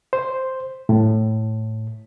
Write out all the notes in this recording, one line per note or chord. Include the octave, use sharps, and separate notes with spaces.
C5
A2